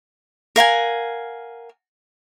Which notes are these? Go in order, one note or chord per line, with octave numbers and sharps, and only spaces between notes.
A#4 F5 F#5 G#5